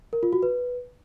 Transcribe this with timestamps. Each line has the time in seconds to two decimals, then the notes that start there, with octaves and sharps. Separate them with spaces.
0.13 A#4
0.23 F4
0.33 F#4
0.43 B4